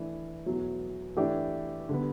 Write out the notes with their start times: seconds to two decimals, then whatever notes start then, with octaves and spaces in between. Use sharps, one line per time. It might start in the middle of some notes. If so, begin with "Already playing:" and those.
Already playing: E3 A3 D4
0.45 E2 B2 F#3 A3
1.17 E3 A3 D4 G4
1.89 D3 G3 B3